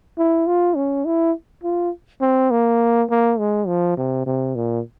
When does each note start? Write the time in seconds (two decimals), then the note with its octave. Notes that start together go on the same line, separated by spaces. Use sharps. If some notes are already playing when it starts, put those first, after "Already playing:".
0.18 E4
0.47 F4
0.76 C#4
1.05 E4
1.63 F4
2.21 C4
2.51 A#3
3.10 A#3
3.39 G#3
3.67 F3
3.97 C3
4.26 C3
4.56 A#2